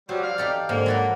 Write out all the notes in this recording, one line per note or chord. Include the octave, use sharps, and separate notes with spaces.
F#3 G3 C5
D5 F5
D#4 G4 A4
G#2 D3 A#3
F#3 A4 B4